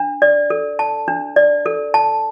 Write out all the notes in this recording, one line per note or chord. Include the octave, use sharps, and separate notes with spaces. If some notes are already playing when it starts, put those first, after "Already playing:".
Already playing: D4
D5
A4
A5
D4
D5
A4
A5